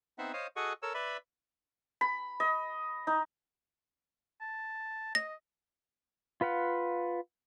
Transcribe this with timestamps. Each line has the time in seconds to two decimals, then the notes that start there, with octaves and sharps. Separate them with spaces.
0.18 B3 C4 D#4 C5 E5 F#5
0.33 C5 C#5 D#5 F5
0.56 F#4 G#4 A4 D#5 F#5 C#6
0.82 A4 A#4 C#5 E6
0.94 B4 D5 E5 B5
2.01 B5
2.40 D#5
3.07 D#4
4.41 A5
5.15 D#5 A#6
6.41 F4 B4 F5 F#5